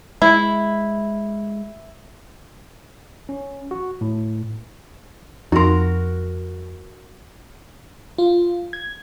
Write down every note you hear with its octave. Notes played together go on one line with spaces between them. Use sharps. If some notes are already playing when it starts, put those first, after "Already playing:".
G#3 E4
C#4
F#4
A2
F2 D#4 F#4 A#4 C6
F4
G#6